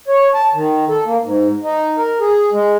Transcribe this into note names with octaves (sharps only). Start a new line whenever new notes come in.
C#5
A5
D#3
A4
A#3
G#2
D#4
A#4
G#4
G#3